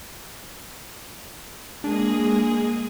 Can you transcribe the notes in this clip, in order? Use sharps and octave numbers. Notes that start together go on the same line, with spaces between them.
G#3 A#3 D4 G#4